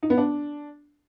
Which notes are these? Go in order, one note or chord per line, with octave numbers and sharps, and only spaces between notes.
D#4
B3
D4